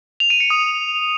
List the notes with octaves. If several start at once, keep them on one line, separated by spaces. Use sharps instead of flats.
F7
D#7
C#7
D#6